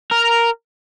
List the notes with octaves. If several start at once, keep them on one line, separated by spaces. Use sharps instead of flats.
A#4